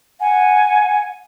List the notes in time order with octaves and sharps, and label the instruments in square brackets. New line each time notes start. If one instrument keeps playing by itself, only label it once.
[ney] F#5 [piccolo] G#5